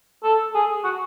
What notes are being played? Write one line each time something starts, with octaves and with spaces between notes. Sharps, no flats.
A4
G#4
F#4